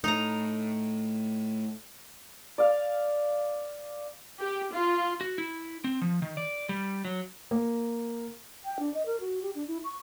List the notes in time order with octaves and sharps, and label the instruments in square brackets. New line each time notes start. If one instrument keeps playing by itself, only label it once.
[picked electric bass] A2 [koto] D#4 A#5
[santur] D5 F5
[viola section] G4
F4
[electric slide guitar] F#4
E4
C4
F3
D#3
D5
G3
F#3
[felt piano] A#3
[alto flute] G5
D4
D#5
A#4
F#4
G4
D4
E4
C#6